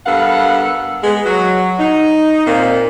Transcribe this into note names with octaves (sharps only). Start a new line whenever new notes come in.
G2 B3 A4 A#4 F5 F#5
G#3 B3 G#4
F#3 F#4
D#4
A#2 A#3 C4